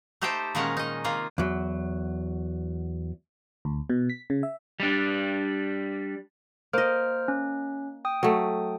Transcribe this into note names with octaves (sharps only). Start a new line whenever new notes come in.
A3 D#4 G4 A4 C5 G5
A#2 D#3 G#3 C#4 A#4 F#5
D#4 D#5
C3 D#3 A#3 F4
E2 F#3
D2
B2
B6
C#3
E5
G3 D4
A#3 C5 D#5 F6
C#4
G5 D#6
F#3 A3